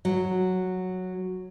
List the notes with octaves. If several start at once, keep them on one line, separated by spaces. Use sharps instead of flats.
F#3